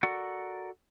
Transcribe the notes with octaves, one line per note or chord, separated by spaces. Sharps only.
F#4 A4 A#4 D5 F#5